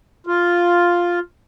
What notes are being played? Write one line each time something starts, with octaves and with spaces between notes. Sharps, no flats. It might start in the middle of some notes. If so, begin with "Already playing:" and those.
F4